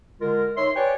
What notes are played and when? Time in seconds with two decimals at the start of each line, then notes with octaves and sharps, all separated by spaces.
0.21 D3 G#3 F4 A#4
0.57 D#4 C#5 E5 C6
0.76 G4 B4 C#5 D5 G5 G#5